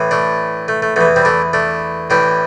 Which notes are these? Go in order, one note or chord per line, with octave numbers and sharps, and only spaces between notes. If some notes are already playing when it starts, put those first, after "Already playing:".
Already playing: A2 E3
A3 D4
A3
A3
E2 E3 A3
G3 C4
A3 D4
A3 D4
A2 E3 D4 G4